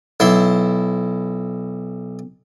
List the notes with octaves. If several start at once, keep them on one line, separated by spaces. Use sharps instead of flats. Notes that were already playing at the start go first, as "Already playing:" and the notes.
B1 E4 C6